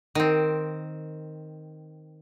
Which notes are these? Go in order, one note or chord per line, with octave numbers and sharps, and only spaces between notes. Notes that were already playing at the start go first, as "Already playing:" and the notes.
D#3 C4